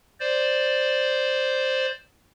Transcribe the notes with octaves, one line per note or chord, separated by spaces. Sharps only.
C5 D5